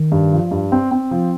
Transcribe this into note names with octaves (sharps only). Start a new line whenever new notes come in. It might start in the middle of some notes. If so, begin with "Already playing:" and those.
Already playing: D#3
G2
F3
G2
C4
C4
F3